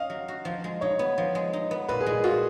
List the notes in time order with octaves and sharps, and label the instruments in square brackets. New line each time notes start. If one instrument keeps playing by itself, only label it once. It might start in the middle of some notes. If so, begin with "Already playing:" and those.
Already playing: [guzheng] C#4 [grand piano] D#5 F5
[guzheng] F#3
F#4
F3
G#3
[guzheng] D#4 [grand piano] C#5
[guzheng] B3
F3
G#3
D#4
B3
[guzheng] A#2 [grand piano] B4
[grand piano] G#4
[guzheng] G#3
[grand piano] G#4
[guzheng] F4 [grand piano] F#4